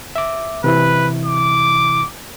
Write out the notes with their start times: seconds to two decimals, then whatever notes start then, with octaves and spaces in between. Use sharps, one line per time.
0.16 E5 D6
0.64 C3 E3 E4 B4
1.25 D6